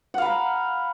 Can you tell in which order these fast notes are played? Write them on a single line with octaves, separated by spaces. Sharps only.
F#5 F5 B5 A#5